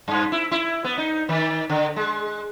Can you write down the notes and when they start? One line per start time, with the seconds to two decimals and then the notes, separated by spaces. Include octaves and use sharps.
0.08 G2
0.32 E4
0.51 E4
0.84 B3
0.98 D#4
1.29 D#3
1.70 D3
1.96 G#3